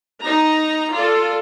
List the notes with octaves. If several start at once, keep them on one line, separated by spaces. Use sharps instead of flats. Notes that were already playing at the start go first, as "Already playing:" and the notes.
D#4 A#5
F4 A4 D5